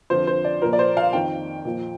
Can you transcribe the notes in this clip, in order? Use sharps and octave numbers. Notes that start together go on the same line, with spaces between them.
F2 D3 F3 C5
C5
D5
A#2 F3 A#4
D5
C5
F5
F2 D#3 G5
A#2 F3